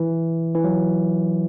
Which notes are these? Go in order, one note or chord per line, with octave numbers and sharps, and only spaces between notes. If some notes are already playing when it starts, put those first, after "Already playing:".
Already playing: E3
E3
F#3